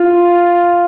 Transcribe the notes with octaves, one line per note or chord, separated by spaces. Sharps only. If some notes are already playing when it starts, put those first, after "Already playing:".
Already playing: F4